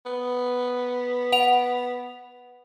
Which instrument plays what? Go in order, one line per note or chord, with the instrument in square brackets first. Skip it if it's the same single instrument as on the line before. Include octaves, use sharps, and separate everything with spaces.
[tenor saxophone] B3
[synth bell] F#5 F7